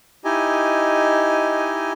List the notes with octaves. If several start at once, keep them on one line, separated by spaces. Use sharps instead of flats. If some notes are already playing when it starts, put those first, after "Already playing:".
D#4 E4 G4 D#5 G#5